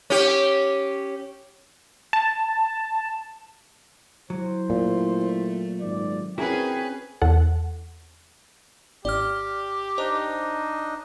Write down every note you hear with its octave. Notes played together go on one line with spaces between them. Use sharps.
C#4 G4
A5
F#3 E4 C5
A#2 A3
G#1 G#2 D5
C4 C#4 E4 F#4 G#4 A#4 B4 G5
E2 A4 F#5
G#1 G4 D5 F6
D4 D#4 C5 D#5